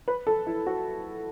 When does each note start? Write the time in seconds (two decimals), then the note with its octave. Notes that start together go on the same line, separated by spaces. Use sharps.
0.08 B4
0.27 A4
0.47 E4
0.67 F#4